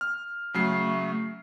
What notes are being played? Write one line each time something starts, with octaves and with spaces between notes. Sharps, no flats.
F6
C#3 F#3 A3 C7